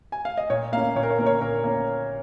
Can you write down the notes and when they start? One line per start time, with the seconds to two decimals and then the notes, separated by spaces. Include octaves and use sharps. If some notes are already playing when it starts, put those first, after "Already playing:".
0.12 G#5
0.25 F5
0.37 D#5
0.50 A#2 C#5
0.72 A#3 F5
0.77 C#4
0.96 A#2 C#5
1.03 A#4
1.10 C#5
1.19 A#3 C#4 A#4
1.26 C#5
1.41 A#2 A#4
1.64 A#3 C#4